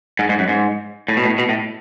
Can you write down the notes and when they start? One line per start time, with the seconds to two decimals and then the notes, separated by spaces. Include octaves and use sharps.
0.19 G#2
0.29 G#2
0.39 F#2
0.49 G#2
1.08 A2
1.17 B2
1.25 A2
1.38 B2
1.49 A2